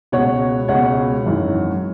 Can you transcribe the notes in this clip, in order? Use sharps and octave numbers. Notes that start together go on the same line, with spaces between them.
C#2 B2 C#5 F#5
C#2 B2 C#5 F#5
G#1 F#2 E3